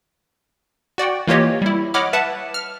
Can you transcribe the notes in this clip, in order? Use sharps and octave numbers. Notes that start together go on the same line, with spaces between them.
F#4 D5 F#5 G5
E3 A#3 F4 G4 C#5 D#5
G3 E4
C#5 D#5 F#5 B5 D6 F6
B4 E5 F#5 A5
F6